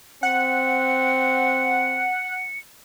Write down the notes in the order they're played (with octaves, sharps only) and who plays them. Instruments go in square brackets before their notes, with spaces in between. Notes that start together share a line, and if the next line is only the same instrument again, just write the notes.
[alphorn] C4 [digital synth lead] F#5 [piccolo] C#7